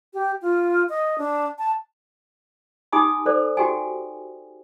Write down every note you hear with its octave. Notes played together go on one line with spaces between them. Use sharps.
G4
F4
D#5
D4
A5
D#4 G4 G#5 B5 D6 D#6
A4 C5 D5
F#4 G4 G5 G#5